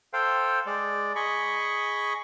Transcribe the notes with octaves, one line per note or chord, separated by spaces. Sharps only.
A4 C5 F5 G5
G#3 D5
G#4 D#5 B5 C#6